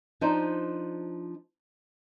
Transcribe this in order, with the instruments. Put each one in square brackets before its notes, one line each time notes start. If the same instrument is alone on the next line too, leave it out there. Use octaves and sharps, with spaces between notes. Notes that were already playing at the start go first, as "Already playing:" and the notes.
[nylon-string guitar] F3 D4 D#4 C5